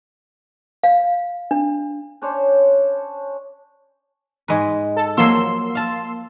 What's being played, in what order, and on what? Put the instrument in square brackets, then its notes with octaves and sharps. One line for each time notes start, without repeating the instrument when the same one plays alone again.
[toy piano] F5
D4
[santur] C#4 D4 C5 C#5
[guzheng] G#2 G#3 B4
[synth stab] A4
[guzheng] F3 F#3 [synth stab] A#3 C6 E6
[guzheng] F5 A5